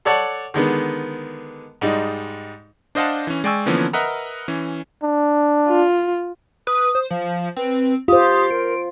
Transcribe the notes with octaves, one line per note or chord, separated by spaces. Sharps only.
A4 C#5 D5 F#5 A5
D3 D#3 G#3 B3
G#2 G3 G#3 D#4
D4 C5 D#5 F5 F#5 A5
E3 C#4
G#3 D5 G5 G#5 C#6 E6
D3 E3 F3 A#3 B3 C#4
A#4 B4 D#5 E5 F#5 A#5
E3 C#4
D4
F4
B4 D#6
C5
F3 F5
C4 B4
F4 G4 C5 D#6
A#4 D7